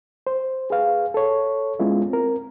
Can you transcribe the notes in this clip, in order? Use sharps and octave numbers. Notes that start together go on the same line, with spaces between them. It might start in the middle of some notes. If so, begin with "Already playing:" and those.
C5
G#4 B4 F5
A4 C#5
G#3 B3 C#4 E4 F4
C4 A#4